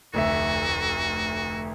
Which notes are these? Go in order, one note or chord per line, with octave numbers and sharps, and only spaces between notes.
F1 D2 F#4 E5